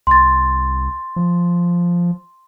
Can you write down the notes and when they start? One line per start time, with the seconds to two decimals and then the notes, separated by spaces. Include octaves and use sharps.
0.07 C2 C6 A6
1.16 F3